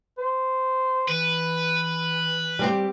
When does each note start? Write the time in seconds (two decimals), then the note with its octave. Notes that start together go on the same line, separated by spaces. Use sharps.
0.18 C5
1.08 E3 B4
2.59 G3 C4 G4